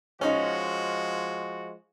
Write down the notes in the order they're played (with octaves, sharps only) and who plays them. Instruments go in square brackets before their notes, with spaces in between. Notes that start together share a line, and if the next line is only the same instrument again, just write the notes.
[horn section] F3 G#3 F#4 [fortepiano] C#4 D#4